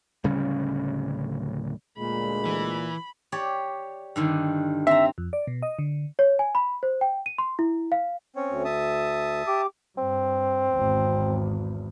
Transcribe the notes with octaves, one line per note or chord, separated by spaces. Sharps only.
D1 C#3 G3 C#4
D2 A#2 G#3 B5
E3
G4 C#5 D5
G2 D3 D#3
C4 E5 A#5
F2
D5
B2
D#5
D3
C#5
G#5
B5
C5
G5
D#7
C6
E4
F5
C4 C#4 C#5
D2
E5 A5 D#6
G4 D6
G2 C4
G#1 E2